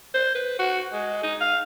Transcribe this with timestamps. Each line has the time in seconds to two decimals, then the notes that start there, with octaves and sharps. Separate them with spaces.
0.14 C5
0.35 B4
0.59 F#4
0.93 G#3
1.23 D#4
1.41 F5